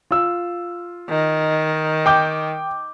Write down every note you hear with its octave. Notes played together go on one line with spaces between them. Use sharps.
F4 E6
D#3
G5 D6 G6